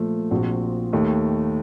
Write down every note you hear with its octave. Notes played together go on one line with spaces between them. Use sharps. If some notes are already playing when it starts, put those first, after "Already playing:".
Already playing: A#2 F3 A3
A#1 A#2 F3 C4 F#4
D#2 D#3 A3